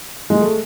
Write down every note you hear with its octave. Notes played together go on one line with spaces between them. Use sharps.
G#3
A3